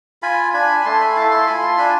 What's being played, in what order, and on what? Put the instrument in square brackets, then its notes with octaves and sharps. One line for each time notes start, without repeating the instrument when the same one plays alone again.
[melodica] F4 G#5 B5
D4 G#5 B5
B5
A3 A5 C6
G#5 B5
E4 F5 A5
A5 C6
F4 G#5 B5
A5 C6
D4 G#5 B5